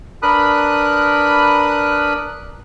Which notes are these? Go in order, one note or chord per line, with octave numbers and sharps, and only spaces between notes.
D4 A#4 B4 B5 D#6 F#6